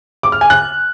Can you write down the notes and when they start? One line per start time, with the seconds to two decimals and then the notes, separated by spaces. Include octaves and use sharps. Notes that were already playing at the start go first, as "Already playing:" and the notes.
0.23 D6
0.32 F6
0.41 G#5
0.50 F#6